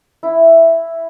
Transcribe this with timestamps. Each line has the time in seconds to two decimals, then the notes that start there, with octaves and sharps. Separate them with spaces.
0.23 E4